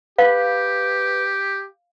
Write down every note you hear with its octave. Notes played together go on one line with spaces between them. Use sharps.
G4 B4 F5